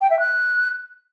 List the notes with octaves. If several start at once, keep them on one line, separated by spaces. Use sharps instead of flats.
G5
E5
F#6